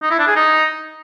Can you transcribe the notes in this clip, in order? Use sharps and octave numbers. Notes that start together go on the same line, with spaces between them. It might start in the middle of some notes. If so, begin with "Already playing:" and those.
D#4
E4
D4
G#4
D#4